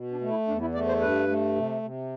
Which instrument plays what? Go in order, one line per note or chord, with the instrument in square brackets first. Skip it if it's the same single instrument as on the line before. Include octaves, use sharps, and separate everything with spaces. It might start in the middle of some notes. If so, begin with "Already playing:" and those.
Already playing: [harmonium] B2
D4
A3
E4
E2 D4
E4
A3 D5
C5
G2 B4
A3
C3
C3